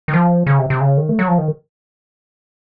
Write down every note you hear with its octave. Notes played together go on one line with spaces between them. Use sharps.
D#3
F3
C#3
C3
C3
C#3
D#3
A3
F#3
F3
D#3